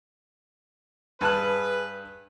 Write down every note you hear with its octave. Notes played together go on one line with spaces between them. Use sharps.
G2 G#4 B4 A5 F#6